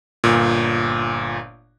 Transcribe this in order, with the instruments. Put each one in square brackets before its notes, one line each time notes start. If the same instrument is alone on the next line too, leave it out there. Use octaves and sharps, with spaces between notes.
[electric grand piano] G1 A#2